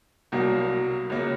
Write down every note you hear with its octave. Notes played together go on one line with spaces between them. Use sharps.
C2 B2 F#3 A#3
C#2 C#3 F#3 A#3